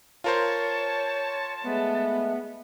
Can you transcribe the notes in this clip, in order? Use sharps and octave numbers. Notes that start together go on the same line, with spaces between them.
F4 A#4 C5 C#5 A5
G#3 A3 B3